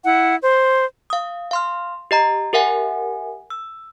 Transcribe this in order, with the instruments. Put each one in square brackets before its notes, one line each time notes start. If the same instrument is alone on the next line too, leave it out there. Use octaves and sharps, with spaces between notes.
[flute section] E4 F#5
C5
[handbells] F5 D#6
F5 C6 F6
G4 D#5 A#5
G4 A#4 E5 F#5 G#5
E6